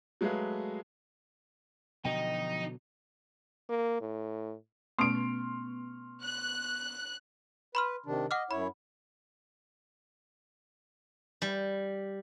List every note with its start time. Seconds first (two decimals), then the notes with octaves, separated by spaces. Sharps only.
0.21 F#3 G#3 A3 G#4 B4 F5
2.05 B2 D3 F3 F#3 D#4 D#5 G5
3.69 A#3
4.01 A2
4.99 B2 A3 B3 C#4 C6 C#6 F6 D7
6.24 F#6
7.75 B4 B5 C6 F6
8.06 C3 D#3 D4
8.31 D#5 F#5 D6 F6
8.51 F#2 E4 C#5 B5
11.42 G3